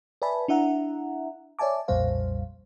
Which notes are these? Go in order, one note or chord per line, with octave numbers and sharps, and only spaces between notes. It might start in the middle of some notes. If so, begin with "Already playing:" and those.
B4 D5 E5 G#5 A5 B5
D4 E4 E5 F#5 A#5
C#5 D5 E5 G#5 A5 D6
B1 F2 A#2 G3 C5 F5